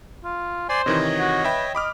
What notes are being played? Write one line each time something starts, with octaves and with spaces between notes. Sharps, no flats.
F4
C5 D5 G#5 C6
C3 D#3 E3 C#5 D#5
F#4
B4 E5 G5
D#5 B5 D6 F6